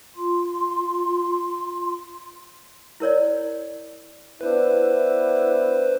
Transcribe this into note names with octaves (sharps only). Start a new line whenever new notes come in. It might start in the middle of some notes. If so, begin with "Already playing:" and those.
F4 C6
E4 A#4 C#5 D5
B3 D4 E4 B4 C5